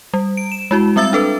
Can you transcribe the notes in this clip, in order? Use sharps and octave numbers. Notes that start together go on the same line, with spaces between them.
G3
D7
E7
G#3 E4 F#4
G3 C4 E5 E6 A6
D4 A4 B4